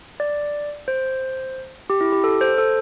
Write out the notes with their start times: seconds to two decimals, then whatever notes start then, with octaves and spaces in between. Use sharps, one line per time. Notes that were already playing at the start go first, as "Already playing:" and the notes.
0.20 D5
0.88 C5
1.90 G4
2.01 E4
2.13 G4
2.24 A4
2.41 C5
2.58 A4